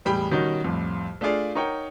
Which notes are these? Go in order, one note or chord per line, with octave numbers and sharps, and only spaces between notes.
E1 A2 G3 G#4 G5 B5
B2 D#3 G3 C#4 D#4 F#4
C2 F2 A2
A3 D4 F4 G#4 D5 F5
D#4 A#4 C#5 F#5 G5